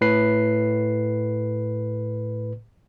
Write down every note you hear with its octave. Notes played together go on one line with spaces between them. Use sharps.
A2 B4 C7